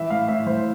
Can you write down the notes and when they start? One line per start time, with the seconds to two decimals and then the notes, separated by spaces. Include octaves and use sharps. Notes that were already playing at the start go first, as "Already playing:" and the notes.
Already playing: E3 E5
0.10 A2 F5
0.28 A2 E5
0.46 E3 C5